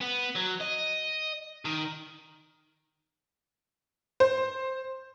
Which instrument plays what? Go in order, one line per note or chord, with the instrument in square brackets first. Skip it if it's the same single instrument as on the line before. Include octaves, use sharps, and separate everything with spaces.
[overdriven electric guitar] B3
F#3
D#5
D#3
[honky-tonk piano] C5